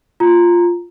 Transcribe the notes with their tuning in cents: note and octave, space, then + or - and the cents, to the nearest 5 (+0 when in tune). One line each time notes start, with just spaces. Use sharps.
F4 +0 A#5 +0